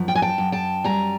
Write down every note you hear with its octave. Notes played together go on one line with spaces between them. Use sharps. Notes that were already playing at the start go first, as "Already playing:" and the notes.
Already playing: F#2 F3
G5
G#5
G5 A5
F#2
G5 A5
G3 G#5 A#5